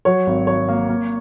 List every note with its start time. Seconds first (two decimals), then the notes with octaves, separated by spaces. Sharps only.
0.05 F#3 C#5
0.27 G#1
0.47 G#1 C#5
0.68 A#3
0.89 A#3